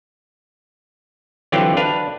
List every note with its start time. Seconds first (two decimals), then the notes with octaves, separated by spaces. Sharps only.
1.52 D3 E3 F#3 C4 F4 G4
1.77 D4 B4 F5